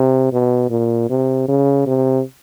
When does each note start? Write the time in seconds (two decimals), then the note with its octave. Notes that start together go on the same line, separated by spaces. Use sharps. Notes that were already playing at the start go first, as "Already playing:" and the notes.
Already playing: C3
0.33 B2
0.70 A#2
1.10 C3
1.48 C#3
1.87 C3